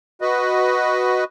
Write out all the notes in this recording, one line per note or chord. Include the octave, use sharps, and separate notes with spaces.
F#4 B4 D#5